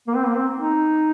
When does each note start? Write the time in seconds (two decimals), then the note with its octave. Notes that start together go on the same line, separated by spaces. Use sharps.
0.08 A#3
0.16 C4
0.26 A#3
0.36 C4
0.56 D#4